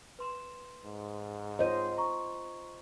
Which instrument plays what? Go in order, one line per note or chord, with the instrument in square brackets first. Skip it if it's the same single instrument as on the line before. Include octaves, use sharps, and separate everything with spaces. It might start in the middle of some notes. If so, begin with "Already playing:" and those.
[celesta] B4 C6 E7
[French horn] G#2
[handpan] F4 C5 D#5 [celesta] C#5 G6 D#7
[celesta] A#5 C#6